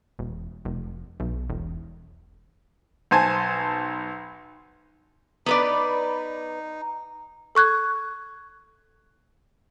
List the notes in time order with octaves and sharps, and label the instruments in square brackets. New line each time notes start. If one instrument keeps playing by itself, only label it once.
[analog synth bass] E1
F1
B1
E1
[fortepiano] B1 C5 G#5 A5
[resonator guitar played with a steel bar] B3 B4 D5 [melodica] D#4
[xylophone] A4 C#6 F#6 G#6